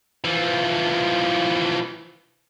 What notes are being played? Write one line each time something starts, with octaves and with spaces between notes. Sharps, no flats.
E3 F3